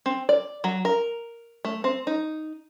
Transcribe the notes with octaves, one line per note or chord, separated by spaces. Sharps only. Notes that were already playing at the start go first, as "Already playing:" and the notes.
C4
D5
F#3
A#4
A3
C4
D#4